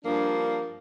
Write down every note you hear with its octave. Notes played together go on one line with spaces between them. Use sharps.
G2 F3 A#3 D4